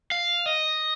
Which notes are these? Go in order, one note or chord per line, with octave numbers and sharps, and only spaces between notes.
F5
D#5